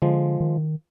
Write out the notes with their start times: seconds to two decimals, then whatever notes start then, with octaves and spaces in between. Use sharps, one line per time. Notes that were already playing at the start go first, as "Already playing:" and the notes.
0.02 D3 F3 G#3
0.40 D#3